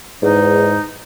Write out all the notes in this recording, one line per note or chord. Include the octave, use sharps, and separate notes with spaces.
E2 G#2 D#4